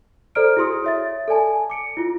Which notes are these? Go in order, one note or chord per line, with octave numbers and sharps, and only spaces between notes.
A4 C5 D5 A#5 F6 D7
E4 F#4 G#4 C6 D#6
C#5 E5 A6
A4 D5 G#5 A5
D6 C#7 D7
E4 F4